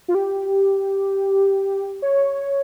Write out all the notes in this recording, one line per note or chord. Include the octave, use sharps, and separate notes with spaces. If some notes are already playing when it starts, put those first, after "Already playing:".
F4
G4
C#5